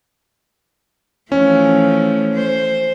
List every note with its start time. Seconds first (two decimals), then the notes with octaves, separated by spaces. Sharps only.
1.32 E3 F3 A3 C#4
2.34 C5